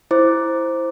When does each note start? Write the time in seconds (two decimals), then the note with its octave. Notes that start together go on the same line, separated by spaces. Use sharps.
0.11 E4 C5 D6